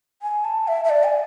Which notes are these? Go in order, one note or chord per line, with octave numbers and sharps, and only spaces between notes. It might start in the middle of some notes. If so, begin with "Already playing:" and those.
G#5
A5
E5
E5
D5
G#5